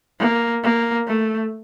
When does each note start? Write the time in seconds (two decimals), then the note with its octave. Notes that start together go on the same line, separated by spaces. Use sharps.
0.20 A#3
0.63 A#3
1.07 A3